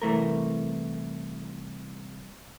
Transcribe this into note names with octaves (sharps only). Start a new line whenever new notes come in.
C2 E3 A3 A#4